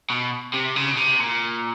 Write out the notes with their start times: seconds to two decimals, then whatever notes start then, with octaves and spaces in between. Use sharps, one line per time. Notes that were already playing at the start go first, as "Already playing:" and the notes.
0.10 B2
0.54 C3
0.76 C#3
0.91 B2
0.97 C3
1.20 A#2